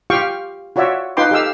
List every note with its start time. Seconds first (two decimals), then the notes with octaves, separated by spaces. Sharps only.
0.10 F4 G4 F5 G5 C#6
0.76 F4 F#4 C#5 D5 E5
1.17 D#4 F4 B4 G5 C6 D6
1.31 G4 A4 F5 E6